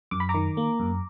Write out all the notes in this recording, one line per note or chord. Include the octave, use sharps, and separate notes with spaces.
F#2 D6
B5
A#5 D6
D#3
A#3
F#2